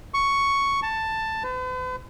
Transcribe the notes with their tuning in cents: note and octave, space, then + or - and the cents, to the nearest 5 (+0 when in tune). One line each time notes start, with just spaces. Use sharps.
C#6 +5
A5 +10
B4 +45